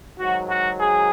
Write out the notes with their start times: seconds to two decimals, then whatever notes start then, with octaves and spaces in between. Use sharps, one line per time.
0.19 G#2 D#3 F#3 F#4
0.49 F#4
0.79 G#4